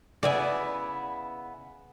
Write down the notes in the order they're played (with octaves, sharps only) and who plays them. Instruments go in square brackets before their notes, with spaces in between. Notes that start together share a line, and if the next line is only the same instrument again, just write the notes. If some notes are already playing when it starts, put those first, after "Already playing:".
[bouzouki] C#3 B3 E4 [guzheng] D5 G#5